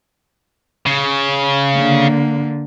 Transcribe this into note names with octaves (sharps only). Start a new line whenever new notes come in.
C#3
D3 A#3